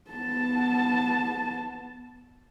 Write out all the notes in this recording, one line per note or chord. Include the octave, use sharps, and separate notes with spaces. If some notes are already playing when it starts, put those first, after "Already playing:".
B3 A5